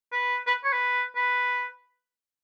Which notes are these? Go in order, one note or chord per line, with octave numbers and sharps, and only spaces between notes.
B4
B4
C#5
B4
B4